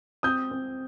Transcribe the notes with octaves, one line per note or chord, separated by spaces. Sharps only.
C4 D#6 G6
C4